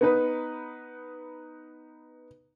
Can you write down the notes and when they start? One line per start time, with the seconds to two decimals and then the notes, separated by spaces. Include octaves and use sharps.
0.01 B3 D#4 B4